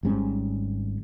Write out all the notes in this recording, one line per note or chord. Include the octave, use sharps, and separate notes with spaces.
G#1 G#2 G3 C#4